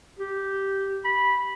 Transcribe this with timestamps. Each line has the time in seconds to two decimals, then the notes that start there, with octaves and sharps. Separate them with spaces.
0.19 G4
1.05 B5